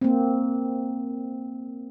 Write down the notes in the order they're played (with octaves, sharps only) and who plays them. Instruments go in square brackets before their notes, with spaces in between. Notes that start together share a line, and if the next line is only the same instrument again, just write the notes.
[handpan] A#3 C4